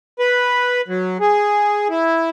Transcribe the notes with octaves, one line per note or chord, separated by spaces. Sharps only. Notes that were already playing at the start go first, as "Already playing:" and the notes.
B4
F#3
G#4
E4